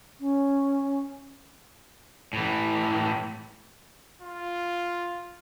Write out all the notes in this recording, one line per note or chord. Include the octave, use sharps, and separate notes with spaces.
C#4
A2 E3
F4